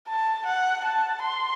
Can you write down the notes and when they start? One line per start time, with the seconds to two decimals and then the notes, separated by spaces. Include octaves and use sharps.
0.09 A5
0.47 F#5
0.85 A5
1.22 C6